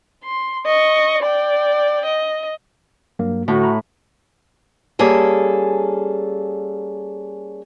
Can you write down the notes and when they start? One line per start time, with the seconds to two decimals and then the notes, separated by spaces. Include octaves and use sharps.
0.24 C6
0.66 D#5 C#6
1.23 D5 G5
2.06 D#5
3.19 G2 F#3 A#3
3.48 A2 D3 F#4
3.64 A#5 B5
4.99 G3 A#3 C#4 G#4 A4